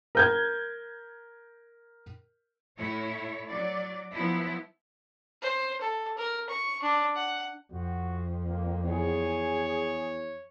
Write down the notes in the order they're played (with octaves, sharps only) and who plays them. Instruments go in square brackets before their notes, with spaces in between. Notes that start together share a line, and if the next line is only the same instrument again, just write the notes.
[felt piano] A#4 G6 G#6
[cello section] A2 E4 C#5
F#3 D5
F3 F#3 B3 E4
[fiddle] C5
A4
A#4
C#6
D4
F#5
[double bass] F2 [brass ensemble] F#4
[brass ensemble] A#3
[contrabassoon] E2 [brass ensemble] G#4 [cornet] C#5